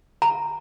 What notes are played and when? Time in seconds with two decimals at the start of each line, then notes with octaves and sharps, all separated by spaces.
0.22 A#5